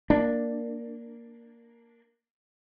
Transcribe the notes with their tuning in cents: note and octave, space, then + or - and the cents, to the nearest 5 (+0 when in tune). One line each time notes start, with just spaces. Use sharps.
A#3 +0 D4 +0